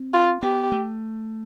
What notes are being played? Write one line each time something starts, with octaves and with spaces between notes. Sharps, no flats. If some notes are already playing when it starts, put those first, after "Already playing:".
Already playing: C4
F4
B3 G4
A3